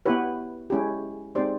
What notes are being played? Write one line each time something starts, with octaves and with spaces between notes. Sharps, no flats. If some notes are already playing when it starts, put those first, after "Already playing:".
B3 E4 G4 B4 C#5
G#3 C#4 E4 G4
G#3 C4 D#4 G4 C5 D5